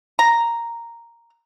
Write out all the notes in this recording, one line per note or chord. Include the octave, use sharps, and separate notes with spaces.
A#5